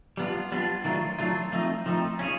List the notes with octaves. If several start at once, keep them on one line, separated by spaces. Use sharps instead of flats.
G3 B3 D4 F4
G3 B3 D4 F4
D#3 F#3 A3 D4 F4
D#3 F#3 A3 D4 F4
F3 A3 C4 D#4
F3 A3 C4 D#4
C#4 F4 G#4 C#5